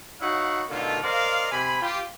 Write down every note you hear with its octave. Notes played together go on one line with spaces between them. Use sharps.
D#4 E4 F#4 C#5 F5 F#5
B2 D3 D#3 A3 A#3 F4
A#4 C5 D5 D#5 F5
C3 C5 G#5 B5
F4 G4